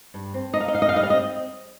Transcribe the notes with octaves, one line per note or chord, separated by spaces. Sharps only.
G2
C4
D#4 D#5
F5
D#5
D#4 F5
D#5
F5
G3 D#5
F5
D#5
C4